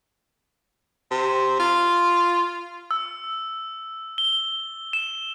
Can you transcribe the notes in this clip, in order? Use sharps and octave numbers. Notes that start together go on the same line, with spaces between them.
C3
F4
E6
G7
E7